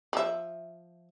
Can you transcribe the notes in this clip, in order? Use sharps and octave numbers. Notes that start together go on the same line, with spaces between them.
F3 E5